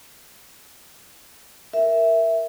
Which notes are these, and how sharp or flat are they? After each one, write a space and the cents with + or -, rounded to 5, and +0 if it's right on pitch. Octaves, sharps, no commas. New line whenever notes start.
A#4 +0 E5 +0